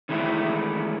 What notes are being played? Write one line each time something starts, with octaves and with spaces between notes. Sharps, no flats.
D#3 E3 G#3 A3 E4